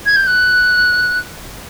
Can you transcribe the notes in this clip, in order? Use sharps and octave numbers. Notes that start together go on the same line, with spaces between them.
G#6
G6
F#6